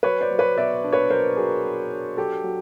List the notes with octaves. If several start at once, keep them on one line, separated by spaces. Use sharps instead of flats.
F#3 B4 C#5
C5 D5
F#3
B4 C#5
B3 D5 E5
D4
B4 C#5
F#3 A#4 C5
F#3 G#4 A#4
B3
D4
F#3 G4 A4
F#3